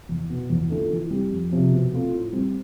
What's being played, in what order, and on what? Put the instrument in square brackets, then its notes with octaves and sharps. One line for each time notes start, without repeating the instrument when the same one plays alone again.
[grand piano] E2
B2 B3
E2
D3 A3 D4 F4
E3
G3 C4 G4
F2
C3 F3
B2
A3 C4 F4
A2
G3 C4